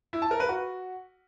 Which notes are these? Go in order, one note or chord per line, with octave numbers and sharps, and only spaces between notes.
E4
A5
A#4
B4
F#4